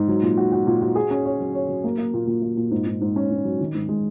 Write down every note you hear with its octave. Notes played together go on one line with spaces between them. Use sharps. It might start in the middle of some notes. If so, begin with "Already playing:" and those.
Already playing: G#2
F#3
A#2
F#4
F#4
A#2
F#4
G#4
C#4
C#5
F#3
C#5
F#3
A#3
A#3
A#2
A#2
A#3
A#2
G#2
G#2
G#2
C#4
G#2
F#3
D#3
G#2
G#3